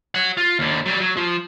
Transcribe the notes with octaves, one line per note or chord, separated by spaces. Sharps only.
C#5 F#5
F4
D#2 D3
F#3 G3
F#3
F3